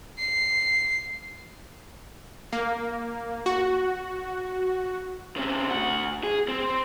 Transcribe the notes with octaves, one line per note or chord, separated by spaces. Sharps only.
C7
A#3
F#4
C#3 C4
D3 F#4
G#4
C4